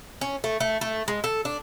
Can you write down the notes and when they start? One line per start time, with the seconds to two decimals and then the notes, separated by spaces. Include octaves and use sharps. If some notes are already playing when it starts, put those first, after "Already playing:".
0.21 C#4
0.44 A3
0.60 A3
0.81 A3
1.08 G#3
1.24 A4
1.45 D4